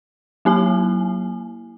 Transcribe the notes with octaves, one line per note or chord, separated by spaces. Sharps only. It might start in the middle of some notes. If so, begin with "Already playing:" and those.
F#3 A#3 E4 G#5